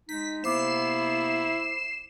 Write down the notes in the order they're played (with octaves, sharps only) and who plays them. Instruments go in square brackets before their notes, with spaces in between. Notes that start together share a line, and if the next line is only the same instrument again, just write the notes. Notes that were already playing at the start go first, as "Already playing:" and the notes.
[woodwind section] G#3 D#4 [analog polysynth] B6
[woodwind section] C3 A#3 B3 [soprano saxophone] E4 [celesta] C5 D6 [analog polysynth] C7 E7